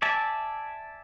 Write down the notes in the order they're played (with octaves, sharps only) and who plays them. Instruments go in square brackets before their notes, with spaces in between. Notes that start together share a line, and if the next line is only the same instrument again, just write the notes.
[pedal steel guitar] D5 E5 G#5 A5